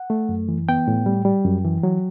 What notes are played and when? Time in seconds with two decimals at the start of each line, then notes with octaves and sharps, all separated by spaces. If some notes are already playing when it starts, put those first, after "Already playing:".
Already playing: F#5
0.10 A3
0.29 F#2
0.49 E3
0.69 B3 G5
0.88 A2
1.06 G3
1.25 G3
1.45 F#2
1.65 E3
1.83 F#3